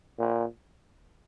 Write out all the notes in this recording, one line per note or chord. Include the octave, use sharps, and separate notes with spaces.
A#2